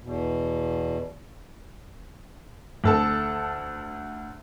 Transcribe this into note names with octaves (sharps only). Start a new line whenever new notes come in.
E2 B2
D2 A4 A5